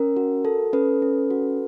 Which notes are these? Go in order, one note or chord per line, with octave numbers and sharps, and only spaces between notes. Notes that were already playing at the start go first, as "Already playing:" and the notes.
Already playing: C#4 A#4
F#4
A4
C#4 A4 B4
C#4
F#4